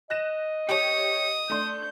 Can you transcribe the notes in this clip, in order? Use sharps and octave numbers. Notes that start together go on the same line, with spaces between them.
D#5 F#6 A#6 E7
G4 C#5 D#6 C#7
A3 D4 C6 G6